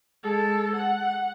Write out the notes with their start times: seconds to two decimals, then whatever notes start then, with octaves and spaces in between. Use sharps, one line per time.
0.23 G#3 A4
0.75 F#5